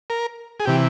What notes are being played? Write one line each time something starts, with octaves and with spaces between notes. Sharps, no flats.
A#4
G#4
C3 E3 G4